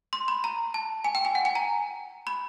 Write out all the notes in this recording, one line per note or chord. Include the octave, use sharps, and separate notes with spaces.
C6
B5
A#5
A5
G#5
G5
G#5
F#5
G#5
A#5
B5